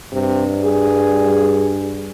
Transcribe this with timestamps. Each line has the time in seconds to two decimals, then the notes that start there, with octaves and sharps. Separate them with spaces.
0.12 G2 C3
0.62 G#4